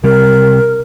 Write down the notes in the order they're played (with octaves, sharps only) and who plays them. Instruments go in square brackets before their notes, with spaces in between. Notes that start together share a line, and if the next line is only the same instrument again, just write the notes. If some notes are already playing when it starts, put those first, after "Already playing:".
[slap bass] C3 G3 [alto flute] A#4